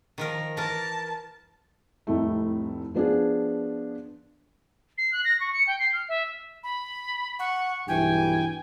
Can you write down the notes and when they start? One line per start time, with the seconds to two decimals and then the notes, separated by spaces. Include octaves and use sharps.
0.18 D#3 F3 A#4
0.57 E3 A#4 A5
2.07 F1 C2 A2 A3
2.94 F3 B3 D4 F4 G#4
4.98 C7
5.12 F#6
5.25 A#6
5.40 C#6
5.53 C#7
5.67 G5
5.79 C7
5.93 F6
6.09 E5
6.63 B5
7.39 F#5 C#6
7.88 B1 G2 E3 G5 G#5